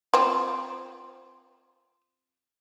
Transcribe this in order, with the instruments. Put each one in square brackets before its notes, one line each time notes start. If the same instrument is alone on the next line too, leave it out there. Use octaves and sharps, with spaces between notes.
[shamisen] C4 F4